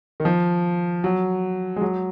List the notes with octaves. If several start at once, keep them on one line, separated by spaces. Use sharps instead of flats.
D#3
F3
F#3
G#3
F#3